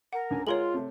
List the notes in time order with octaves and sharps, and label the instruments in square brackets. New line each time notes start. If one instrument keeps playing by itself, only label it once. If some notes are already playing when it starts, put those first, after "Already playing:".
[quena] A#4 [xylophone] F#5
[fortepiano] C#2 D3 G#5
[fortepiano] G#3 G#4 A#4 [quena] F4 [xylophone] C#5 C6 F#7
[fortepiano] C3 A3